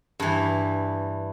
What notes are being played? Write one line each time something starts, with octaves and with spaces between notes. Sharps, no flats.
G2 E3